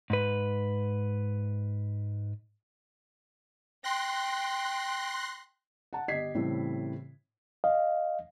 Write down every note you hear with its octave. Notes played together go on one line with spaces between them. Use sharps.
G#2 B4
G5 C6 F#6 A#6
F#5 A5
G1 G4 D#5 G#6 B6 C7
A2 C#3 E3 G3 C4
D#5 F5